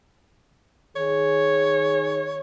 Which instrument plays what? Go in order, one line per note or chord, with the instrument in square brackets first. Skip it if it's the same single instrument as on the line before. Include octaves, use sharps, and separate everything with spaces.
[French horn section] D#3 G#4 [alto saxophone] C#5